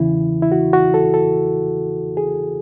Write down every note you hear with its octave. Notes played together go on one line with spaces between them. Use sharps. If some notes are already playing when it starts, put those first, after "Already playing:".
Already playing: E2 C#3 E3 E4
E4
F#4
F#4
A4
A4
G#4